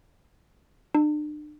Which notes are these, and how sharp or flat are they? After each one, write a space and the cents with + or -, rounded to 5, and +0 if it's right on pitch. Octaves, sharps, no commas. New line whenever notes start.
D4 +40